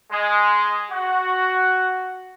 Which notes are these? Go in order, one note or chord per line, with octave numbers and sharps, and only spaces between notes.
G#3
F#4